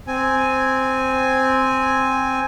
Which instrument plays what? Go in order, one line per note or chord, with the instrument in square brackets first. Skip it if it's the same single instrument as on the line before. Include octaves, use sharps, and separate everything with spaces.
[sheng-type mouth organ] C4 G#5